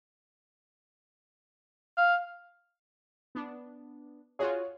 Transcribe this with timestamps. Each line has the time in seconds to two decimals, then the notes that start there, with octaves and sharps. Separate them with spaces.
1.97 F5
3.35 B3 D4
4.39 F4 F#4 G#4 C#5